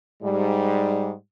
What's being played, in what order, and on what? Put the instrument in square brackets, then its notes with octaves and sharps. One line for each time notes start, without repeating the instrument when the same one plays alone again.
[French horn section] G#2 G3